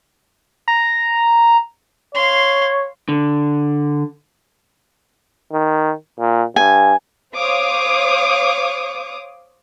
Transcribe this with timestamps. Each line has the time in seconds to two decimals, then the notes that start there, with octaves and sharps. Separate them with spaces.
0.68 A#5
2.15 C#5 F5 C6
3.09 D3
5.53 D#3
6.20 A#2
6.56 G2 G#5
7.35 C5 C#5 F5 D6 D#6